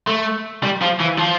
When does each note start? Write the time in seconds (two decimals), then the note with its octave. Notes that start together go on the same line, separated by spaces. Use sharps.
0.08 A3
0.63 G3
0.82 F3
1.00 E3
1.19 F3